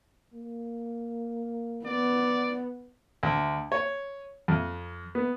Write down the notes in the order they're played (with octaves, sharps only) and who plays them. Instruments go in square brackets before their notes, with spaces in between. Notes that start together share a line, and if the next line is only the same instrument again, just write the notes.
[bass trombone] A#3
[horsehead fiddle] B3 [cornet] D5
[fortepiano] D2
C#5
F2
B3